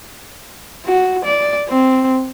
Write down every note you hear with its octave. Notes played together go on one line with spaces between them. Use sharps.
F#4
D5
C4